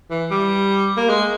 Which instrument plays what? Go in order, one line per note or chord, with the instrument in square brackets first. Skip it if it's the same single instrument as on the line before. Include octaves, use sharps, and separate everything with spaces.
[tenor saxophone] E3
G3
A#3
G#3